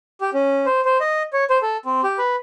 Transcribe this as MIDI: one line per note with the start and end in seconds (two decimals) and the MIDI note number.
0.21 0.30 67
0.34 0.66 61
0.66 0.81 72
0.85 0.97 72
1.01 1.23 75
1.33 1.44 73
1.50 1.58 72
1.62 1.77 69
1.85 2.01 60
2.04 2.18 67
2.18 2.36 71